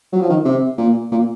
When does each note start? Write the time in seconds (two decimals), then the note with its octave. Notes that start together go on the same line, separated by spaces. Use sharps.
0.12 F#3
0.21 F3
0.29 D#3
0.45 C3
0.78 A#2
1.11 A#2